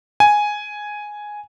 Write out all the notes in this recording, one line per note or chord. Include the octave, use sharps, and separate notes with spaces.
G#5